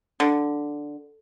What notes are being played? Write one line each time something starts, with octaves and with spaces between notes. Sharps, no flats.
D3